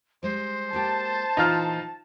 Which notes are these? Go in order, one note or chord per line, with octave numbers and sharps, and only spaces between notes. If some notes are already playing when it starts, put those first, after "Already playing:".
G3 G#3 C5
G#3 A#3 G4 A5
A#2 E3 D#4 F4 F6